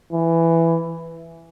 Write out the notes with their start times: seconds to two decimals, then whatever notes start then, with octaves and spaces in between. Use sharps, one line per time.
0.13 E3